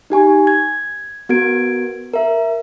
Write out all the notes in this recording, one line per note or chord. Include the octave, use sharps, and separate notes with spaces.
D#4 G4 G#5 C#6
G#6
B3 F#4 A#4 G#6 D7
A#4 E5